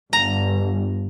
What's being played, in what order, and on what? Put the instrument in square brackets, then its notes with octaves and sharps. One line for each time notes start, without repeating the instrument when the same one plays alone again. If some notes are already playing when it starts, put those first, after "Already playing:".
[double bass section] G1 [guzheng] A#5